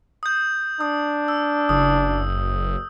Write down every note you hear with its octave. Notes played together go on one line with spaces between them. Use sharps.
D#6 G6
D4 D#6
E6
F#1 D#6